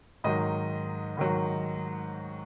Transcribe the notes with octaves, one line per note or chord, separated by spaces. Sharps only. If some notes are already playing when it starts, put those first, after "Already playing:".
G#2 D#3 F#3 D#5
G#2 D#3 F#3